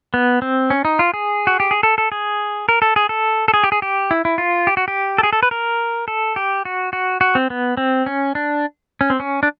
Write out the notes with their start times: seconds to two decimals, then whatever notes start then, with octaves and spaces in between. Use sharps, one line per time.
0.14 B3
0.42 C4
0.70 C#4
0.85 D#4
0.99 F4
1.14 G#4
1.47 F#4
1.60 G4
1.71 G#4
1.83 A4
1.98 A4
2.12 G#4
2.69 A#4
2.82 A4
2.96 G#4
3.09 A4
3.48 A4
3.54 G#4
3.64 G4
3.72 G#4
3.82 G4
4.11 E4
4.25 E4
4.38 F4
4.67 G4
4.77 F#4
4.88 G4
5.18 A4
5.23 G#4
5.33 A4
5.43 B4
5.51 A#4
6.08 A4
6.36 G4
6.65 F#4
6.93 F#4
7.21 F#4
7.35 C4
7.50 B3
7.77 C4
8.06 C#4
8.35 D4
9.01 C#4
9.10 C4
9.20 C#4
9.43 D4